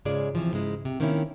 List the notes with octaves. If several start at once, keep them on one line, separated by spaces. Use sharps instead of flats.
G#2 C#3 G#3 F4 G#4 D5
C3 E3 F3
G#2 C#3 G#3 E4
C3
D#3 A#3 C4 C#4 E4